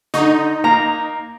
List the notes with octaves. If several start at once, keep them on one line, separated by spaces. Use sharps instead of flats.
D3 D#4 C#6
A#3 A#5